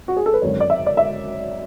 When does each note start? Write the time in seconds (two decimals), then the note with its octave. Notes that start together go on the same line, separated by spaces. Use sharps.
0.08 F#4
0.17 G#4
0.26 A4
0.33 B4
0.42 G#1 F#2 D3 C#5
0.60 D5
0.70 E5
0.86 D5
0.97 E5